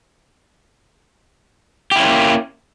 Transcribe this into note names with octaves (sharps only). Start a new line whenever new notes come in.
A#3 C#4 E4 G4